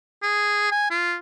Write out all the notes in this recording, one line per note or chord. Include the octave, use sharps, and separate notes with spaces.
G#4
G#5
F4